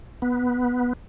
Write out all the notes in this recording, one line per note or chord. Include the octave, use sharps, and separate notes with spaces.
B3